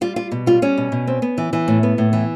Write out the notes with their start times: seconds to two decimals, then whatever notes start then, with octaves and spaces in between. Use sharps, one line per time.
0.01 G3 F4
0.16 G3 F4
0.31 B2
0.46 G3 F4
0.62 G3 C#4
0.78 B2
0.92 B2
1.07 C4
1.22 B3
1.38 E3
1.53 E3
1.68 A2
1.83 B3
1.98 A2
2.13 E3